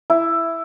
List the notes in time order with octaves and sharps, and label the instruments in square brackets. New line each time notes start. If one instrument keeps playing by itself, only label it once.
[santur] E4